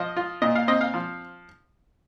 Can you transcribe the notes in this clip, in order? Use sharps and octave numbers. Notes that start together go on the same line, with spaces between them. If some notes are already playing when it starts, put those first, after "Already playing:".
Already playing: F3 D#5
F4
A#2 D#5
F5
C4 D#5
F5
F3